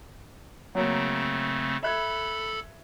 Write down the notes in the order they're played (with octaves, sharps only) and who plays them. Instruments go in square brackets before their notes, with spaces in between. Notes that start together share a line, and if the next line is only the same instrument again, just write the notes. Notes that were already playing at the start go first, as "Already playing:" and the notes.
[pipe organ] C#3 A3 C4 [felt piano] F#3 A#3
[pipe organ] A4 B5 [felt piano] E5 F#6 G#6